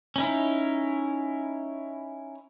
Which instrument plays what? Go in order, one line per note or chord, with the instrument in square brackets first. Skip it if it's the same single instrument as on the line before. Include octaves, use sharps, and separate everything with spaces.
[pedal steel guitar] C#4 D#4 E4